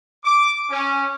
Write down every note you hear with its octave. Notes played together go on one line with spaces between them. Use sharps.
D6
C#4